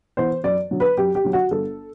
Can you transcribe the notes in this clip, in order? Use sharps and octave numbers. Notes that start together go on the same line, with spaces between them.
E3 B3 C5
F#2 D5
D3 F#3
B4
F#2 G4
G4
D3 F#3
F#4
G1 A4